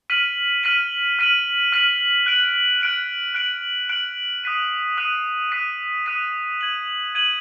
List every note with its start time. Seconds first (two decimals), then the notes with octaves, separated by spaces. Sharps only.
0.10 F6 B6 D#7 F#7
0.63 F6 B6 D#7 F#7
1.19 F6 B6 D#7 F#7
1.72 F6 B6 D#7 F#7
2.26 F#6 D7 F#7
2.81 F#6 D7 F#7
3.34 F#6 D7 F#7
3.89 F#6 D7 F#7
4.44 D#6 F#6 B6 D#7
4.97 D#6 F#6 B6 D#7
5.52 D#6 F#6 B6 D#7
6.06 D#6 F#6 B6 D#7
6.61 G#6 D#7 F#7
7.15 G#6 D#7 F#7